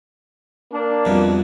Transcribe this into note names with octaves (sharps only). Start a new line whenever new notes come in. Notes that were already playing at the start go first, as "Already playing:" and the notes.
A#3 D4
C2 F2 B2